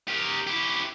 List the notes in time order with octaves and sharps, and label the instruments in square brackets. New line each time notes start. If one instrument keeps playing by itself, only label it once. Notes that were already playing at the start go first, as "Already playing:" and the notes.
[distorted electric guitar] G4 A#4
E4 G4